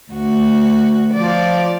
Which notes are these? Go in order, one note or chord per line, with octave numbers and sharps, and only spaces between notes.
D2 F#4
F3 D5